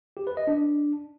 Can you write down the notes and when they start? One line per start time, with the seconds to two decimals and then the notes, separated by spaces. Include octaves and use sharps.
0.17 G4
0.27 B4
0.37 D#5
0.47 D4